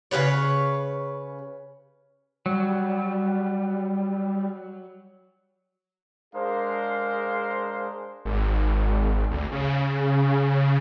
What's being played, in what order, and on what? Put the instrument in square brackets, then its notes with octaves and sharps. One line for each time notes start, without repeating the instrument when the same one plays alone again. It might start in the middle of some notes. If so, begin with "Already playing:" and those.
[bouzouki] C#3 G3 B4 C#5
[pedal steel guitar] F#3 [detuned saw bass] G3
[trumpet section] G#3 D4 G#4 A#4 C5 F5
[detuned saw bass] G#1
D2
C#3